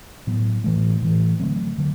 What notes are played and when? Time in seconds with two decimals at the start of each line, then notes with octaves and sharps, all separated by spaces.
0.27 A2 F#3 B3
0.64 A2 E3 A3
1.02 A2 E3 A3
1.40 D3 F#3 A3 C4
1.78 D3 F#3